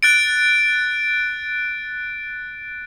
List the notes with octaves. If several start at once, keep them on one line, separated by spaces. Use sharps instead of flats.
F#6 A6 D7